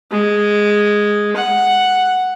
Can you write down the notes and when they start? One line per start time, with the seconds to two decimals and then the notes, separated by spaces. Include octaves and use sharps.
0.11 G#3
1.36 F#5